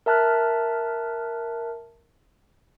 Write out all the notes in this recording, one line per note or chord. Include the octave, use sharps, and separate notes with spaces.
A#4 E5 A5 F6 F#6